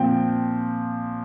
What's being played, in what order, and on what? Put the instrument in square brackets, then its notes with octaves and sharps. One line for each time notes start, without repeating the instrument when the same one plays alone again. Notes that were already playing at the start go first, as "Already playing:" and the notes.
Already playing: [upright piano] A#2 F3 C4 G5